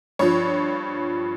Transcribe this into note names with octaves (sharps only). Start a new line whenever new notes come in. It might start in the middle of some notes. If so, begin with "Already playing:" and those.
G2 F3 C#5